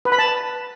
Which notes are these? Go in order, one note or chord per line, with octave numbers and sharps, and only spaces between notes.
B4
B5
A5